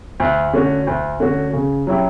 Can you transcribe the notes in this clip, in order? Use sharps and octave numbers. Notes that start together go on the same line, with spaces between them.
D2
D3 A3 C#4 F#4
D2
D3 A3 C#4 F#4
C#3
F#3 C#4 E4 G4